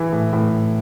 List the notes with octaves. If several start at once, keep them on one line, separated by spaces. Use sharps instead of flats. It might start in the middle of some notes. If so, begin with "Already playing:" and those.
Already playing: E3
A2
A2